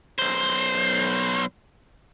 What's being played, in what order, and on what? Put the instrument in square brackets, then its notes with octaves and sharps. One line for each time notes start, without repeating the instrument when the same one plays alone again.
[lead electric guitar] B1 C5